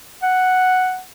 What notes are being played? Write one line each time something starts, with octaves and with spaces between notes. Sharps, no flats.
F#5